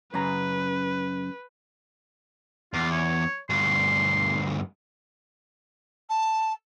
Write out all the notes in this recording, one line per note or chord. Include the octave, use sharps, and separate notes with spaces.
F#2 C#3 B4 A#5
E2 F4
C#5
D2 G2 C6
A5